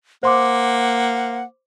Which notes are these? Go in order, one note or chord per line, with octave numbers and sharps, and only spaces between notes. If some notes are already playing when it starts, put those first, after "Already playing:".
A#3 C5 F#5 C6 D6